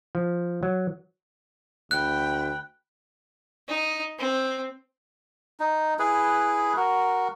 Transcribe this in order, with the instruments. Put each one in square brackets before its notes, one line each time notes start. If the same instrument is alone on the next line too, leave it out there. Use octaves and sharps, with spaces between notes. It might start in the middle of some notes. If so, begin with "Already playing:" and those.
[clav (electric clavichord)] F3
F#3
[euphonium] D2 [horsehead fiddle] G5 B5 [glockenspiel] F#6
[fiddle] D#4
C4
[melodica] D#4
E4 G#4 B4
F#4 A#4